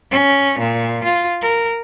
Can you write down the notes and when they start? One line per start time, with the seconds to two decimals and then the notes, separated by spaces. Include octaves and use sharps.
0.11 C#4
0.59 A#2
1.04 F4
1.42 A#4